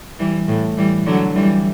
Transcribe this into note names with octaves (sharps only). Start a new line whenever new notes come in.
E3 G3
A2
E3 G3
D3 F#3
E3 G3